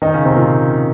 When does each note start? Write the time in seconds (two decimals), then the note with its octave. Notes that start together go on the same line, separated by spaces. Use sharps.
0.02 D#3 D#4
0.14 C#3 C#4
0.25 C3 C4
0.36 A#2 A#3